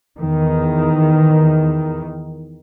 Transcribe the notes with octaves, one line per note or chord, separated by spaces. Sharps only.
E2 D#3